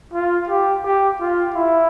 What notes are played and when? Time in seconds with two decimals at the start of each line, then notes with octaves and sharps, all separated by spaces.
0.13 F4
0.49 G4
0.84 G4
1.20 F4
1.56 E4